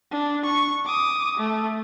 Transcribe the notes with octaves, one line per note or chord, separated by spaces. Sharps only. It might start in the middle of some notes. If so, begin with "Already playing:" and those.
D4
C#6
D6 D#6
A3